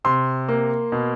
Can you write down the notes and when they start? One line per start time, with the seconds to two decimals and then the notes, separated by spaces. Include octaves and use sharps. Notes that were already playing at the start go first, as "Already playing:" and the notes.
0.04 C3 C6
0.48 A#3
0.92 B2